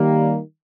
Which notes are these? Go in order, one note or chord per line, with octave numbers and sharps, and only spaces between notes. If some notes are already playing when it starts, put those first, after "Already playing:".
Already playing: D#3 G3 A#3